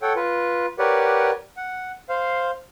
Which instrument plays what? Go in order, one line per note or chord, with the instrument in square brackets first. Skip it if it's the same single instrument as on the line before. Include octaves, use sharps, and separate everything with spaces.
[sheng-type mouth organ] A4 C#5 F#5 G5
F4 B4
G4 A#4 B4 C#5 D5 F#5
F#5
C5 F5